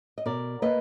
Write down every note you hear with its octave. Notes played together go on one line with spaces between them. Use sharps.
D#5
B2 A#4 D5
A#3 B4 D#5